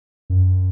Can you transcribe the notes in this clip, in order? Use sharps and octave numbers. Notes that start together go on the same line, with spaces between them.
F#2